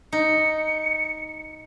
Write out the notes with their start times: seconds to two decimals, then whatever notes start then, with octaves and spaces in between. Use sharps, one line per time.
0.13 D#4 C#7